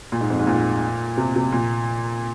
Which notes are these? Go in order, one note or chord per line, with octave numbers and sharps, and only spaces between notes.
A#2
G#2
F2
G#2
A#2
C3
C3
A#2